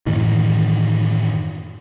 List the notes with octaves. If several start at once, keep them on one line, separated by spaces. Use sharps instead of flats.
F#2 A2 D#3 E3